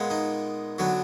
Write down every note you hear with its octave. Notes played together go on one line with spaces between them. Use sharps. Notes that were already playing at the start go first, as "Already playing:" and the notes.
Already playing: A#2 G#3 B3
D#4
D3 F#3 B3